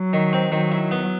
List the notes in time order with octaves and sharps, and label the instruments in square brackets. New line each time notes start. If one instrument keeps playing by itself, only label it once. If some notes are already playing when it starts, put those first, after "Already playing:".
Already playing: [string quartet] F#3
[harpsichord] D#3
C4
[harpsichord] D#3 [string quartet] F#3
[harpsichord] E4
B3